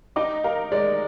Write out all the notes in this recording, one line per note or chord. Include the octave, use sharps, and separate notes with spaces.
D#4 D6
A#4 F5
G#3 D5